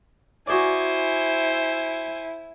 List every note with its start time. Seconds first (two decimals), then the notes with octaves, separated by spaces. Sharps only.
0.47 E4 F#4 G#4 C5 D5 G#5